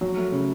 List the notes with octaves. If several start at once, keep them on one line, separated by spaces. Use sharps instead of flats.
F#3
A3
C#3